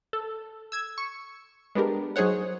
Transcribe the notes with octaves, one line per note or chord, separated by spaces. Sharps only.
A4
E6 G#6
C#6
G#3 B3 D4 G4 A#4
F#3 D#4 G#4 C5 C#5 F#5